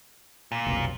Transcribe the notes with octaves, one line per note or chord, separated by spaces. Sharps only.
A#2
F1 B1